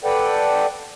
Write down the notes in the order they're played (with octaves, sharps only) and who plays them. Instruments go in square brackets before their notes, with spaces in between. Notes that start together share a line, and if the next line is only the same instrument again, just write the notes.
[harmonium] A4 B4 D5 F#5 G5